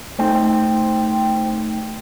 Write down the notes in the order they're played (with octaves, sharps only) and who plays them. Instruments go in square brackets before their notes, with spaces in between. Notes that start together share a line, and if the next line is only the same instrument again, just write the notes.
[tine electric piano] A3 D#4 [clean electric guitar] C4